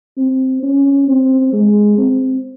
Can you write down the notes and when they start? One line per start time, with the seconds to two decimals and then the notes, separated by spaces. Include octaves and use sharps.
0.17 C4
0.63 C#4
1.08 C4
1.53 G#3
1.98 C4